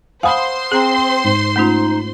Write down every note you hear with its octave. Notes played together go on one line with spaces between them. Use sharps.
C5 F5 F#5 G#5 B5 C6 D#6
C4 G#4 A#5
G#2
A3 C#4 D#4 F4